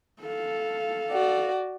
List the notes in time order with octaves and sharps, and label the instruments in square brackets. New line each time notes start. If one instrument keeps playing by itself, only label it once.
[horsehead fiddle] A4 F5
[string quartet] F#4 D5